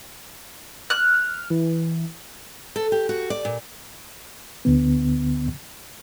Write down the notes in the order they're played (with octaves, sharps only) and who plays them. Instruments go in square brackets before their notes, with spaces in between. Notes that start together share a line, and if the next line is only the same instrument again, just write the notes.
[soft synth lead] F6 [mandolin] F#6
[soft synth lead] E3
[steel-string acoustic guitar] A4
G4
F#4
D5
A#2
[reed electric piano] D2 D3 B3